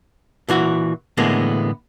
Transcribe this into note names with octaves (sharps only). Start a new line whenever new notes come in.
A#2 E3 F#4
A2 D3 E3 G#3 A#3 B3